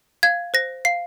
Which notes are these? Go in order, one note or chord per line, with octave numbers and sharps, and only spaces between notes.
F5 G#6
C5 A#6
F5 C7